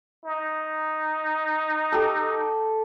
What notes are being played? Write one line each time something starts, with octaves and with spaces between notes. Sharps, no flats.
D#4
G4 A4